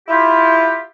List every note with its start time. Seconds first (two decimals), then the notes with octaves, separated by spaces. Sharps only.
0.08 E4 F4 G4